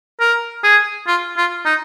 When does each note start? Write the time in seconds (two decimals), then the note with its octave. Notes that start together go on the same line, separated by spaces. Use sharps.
0.20 A#4
0.64 G#4
1.07 F4
1.37 F4
1.65 D#4